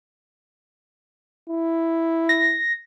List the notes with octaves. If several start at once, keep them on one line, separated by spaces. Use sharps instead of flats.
E4
A#6